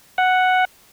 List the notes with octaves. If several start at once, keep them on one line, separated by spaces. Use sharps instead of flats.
F#5